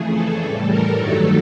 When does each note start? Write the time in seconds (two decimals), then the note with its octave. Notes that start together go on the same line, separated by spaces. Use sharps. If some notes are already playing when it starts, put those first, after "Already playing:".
Already playing: F2 C#3 E3 A3 G#4
0.12 A4
0.41 A2 E3 G3
0.69 A#4
0.99 G2 D#3 F#3 A3 A4